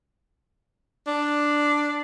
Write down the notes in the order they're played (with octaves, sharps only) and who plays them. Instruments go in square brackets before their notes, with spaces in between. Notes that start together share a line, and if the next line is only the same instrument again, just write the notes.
[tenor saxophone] D4